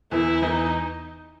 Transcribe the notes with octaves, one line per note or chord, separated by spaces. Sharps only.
E2 E3 E4
E2 E3 D#4